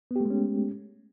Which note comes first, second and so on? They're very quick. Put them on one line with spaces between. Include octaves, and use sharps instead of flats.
B3 G4 A3 G#3 C#4